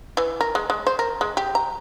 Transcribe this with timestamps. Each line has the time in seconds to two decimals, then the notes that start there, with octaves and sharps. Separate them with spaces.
0.17 E3
0.41 A#4
0.55 G#3
0.70 G#3
0.87 C5
0.99 A#4
1.21 G#3
1.37 G4
1.55 A#5